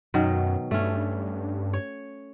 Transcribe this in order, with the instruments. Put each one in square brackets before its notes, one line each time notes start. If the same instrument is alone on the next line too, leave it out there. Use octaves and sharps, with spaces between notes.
[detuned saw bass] F#2 [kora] B2 D#3 F#3
[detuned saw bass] G2 [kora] A3 C#4
[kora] C#5